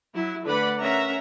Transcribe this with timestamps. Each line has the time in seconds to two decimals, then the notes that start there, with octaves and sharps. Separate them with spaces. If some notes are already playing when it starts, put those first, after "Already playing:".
0.14 F#3 E4
0.45 D3 A3 B4 D5 F#5 B5
0.79 C#4 A#4 E5 F#5 A#5